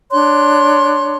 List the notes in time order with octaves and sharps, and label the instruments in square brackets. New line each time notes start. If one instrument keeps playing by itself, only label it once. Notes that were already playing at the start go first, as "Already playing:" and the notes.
[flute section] D4 C#5 C6 F#6